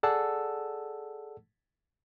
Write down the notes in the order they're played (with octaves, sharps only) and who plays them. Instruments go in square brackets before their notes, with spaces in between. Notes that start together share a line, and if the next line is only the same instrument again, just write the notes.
[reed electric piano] G#4 A4 D5 F#5 A5 E6